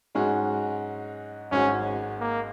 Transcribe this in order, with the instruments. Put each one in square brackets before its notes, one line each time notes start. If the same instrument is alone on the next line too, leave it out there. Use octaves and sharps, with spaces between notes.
[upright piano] G#2 G#3 C#4 F#4
[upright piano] G#1 G#2 G#3 F#4 [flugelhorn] C#4
[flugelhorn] A#3